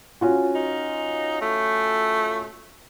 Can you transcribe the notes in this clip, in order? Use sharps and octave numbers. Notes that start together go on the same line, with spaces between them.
C#4 F4 F#4
D#4
A3